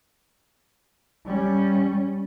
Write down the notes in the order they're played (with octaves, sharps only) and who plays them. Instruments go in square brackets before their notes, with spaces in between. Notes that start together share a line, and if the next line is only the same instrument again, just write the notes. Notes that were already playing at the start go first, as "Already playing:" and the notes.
[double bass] G3 C#4